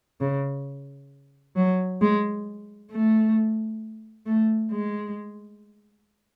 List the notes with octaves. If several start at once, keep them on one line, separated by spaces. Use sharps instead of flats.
C#3
F#3
G#3
A3
A3
G#3